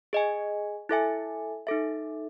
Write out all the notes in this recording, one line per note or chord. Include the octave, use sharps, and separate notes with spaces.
G#4 D#5 G#5
E4 A4 E5 G#5
D#4 A4 E5